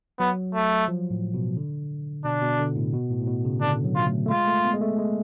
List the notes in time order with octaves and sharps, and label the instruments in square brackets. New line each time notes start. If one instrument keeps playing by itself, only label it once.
[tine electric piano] F#3 [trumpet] B3
[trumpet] A3
[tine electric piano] F3
A2
B2
D3
[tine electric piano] B2 [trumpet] D4
[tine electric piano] B2
D3
A2
B2
A2
A2
B2
C#3
[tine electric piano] D3 [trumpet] D4
[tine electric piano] F#3
[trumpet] F4
[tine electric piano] A3
A3
[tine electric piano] G#3 [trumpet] F4
[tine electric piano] A3
B3
G#3
A3
G#3